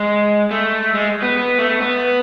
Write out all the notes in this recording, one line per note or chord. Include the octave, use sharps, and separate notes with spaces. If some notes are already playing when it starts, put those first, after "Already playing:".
Already playing: G#3
A3
G#3
B3
B3
A3
B3